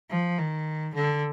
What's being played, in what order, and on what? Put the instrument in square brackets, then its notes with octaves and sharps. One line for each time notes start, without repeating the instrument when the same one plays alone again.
[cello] F3
D#3
D3